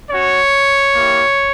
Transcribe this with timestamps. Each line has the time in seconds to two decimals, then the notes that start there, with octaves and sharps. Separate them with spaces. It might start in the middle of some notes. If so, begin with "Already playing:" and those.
0.10 C#4 F#4 C#5
0.95 A#3 E4 G4